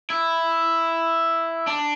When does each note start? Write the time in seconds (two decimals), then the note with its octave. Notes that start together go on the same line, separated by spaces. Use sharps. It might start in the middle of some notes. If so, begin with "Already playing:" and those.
0.10 E4
1.67 D4